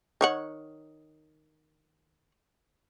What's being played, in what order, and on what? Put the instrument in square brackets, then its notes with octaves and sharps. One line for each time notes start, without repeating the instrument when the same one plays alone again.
[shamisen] D#3 C#5 F#5